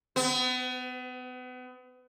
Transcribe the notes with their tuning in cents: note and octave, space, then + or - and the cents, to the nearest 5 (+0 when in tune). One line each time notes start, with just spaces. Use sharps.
B3 +35